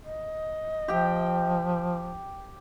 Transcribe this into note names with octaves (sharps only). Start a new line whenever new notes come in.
D#5
F3 G4 G5